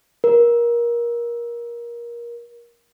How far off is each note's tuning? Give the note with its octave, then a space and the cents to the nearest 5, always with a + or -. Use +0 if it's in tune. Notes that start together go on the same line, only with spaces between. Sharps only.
A#4 +25